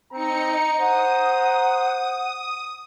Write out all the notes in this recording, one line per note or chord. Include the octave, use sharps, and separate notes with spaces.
C4 D#4 A#5 C#7
C5 F#5 D#6